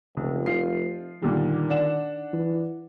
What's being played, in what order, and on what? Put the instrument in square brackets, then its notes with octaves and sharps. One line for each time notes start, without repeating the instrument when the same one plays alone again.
[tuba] F1 [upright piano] C#2
[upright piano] F3 F4 C7
[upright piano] A#2 D3 G3 [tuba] D#3
[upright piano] D4 F#5 E7
[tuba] E3